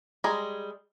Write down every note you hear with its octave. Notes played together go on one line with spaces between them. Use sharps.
G3 G#3 G#4 A#5